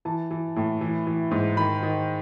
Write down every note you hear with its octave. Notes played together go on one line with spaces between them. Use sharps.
E3 A5
E3
A2
E3
E3
G#2
D#3 B5
D#3